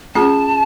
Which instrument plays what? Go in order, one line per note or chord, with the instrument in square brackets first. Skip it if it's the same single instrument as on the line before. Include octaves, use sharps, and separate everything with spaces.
[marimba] A3 C#4 F4 G#4 [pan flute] A5